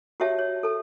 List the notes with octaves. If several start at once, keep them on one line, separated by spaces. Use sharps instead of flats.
F#4 G4 C#5 E5 A5
C#5
A4 A5